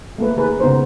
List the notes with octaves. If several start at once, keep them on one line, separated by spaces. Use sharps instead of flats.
A3 A#3 B4
D#3 G#4 A#4 B4
C#3 B3 D#4 A#4 C5